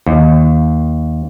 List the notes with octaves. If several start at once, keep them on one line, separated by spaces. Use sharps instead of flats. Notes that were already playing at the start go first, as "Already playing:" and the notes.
D#2